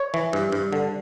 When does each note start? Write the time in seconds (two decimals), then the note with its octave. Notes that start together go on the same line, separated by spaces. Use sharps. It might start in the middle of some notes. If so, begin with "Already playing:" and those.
Already playing: C#5
0.14 E3
0.33 G2
0.52 G2
0.73 D3